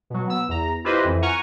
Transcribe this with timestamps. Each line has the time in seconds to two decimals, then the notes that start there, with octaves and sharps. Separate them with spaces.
0.10 B2 F#3
0.27 B3 E6
0.49 E2 A#5
0.84 E4 F4 G4 B4 C5 D#5
1.04 F2 E3
1.22 F#5 G#5 A#5 C#6 F6